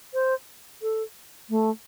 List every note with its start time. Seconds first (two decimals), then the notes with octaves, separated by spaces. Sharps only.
0.13 C5
0.82 A4
1.49 A3